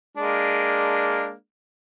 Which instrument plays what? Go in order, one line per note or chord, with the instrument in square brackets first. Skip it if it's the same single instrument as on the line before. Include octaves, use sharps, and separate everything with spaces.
[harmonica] G#3 A#3 D4